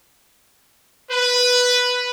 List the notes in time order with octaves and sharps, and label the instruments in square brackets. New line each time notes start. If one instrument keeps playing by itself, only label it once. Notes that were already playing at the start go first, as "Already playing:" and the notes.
[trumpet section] B4